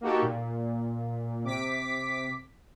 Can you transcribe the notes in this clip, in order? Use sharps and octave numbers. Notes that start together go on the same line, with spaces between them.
A#3 D#4 F#4 G4 A4
A#2
C3 D6 B6